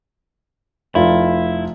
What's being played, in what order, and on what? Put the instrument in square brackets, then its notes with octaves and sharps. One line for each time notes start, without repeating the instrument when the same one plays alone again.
[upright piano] F1 F4 [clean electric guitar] E4